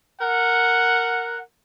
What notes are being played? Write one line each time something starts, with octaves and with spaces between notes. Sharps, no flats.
A#4 F#5